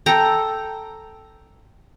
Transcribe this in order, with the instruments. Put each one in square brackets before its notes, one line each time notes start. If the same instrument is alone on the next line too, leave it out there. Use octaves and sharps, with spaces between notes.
[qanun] A4 G5 A#5